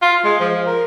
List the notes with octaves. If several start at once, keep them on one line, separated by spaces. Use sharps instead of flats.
F4
G#3
F3
A#4